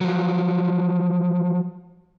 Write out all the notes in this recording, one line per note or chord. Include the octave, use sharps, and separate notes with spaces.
F3 F#3